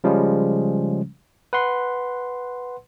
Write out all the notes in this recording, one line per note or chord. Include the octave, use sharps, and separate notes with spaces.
C#3 F3 G3 G#3 C#4
B4 F#5 C6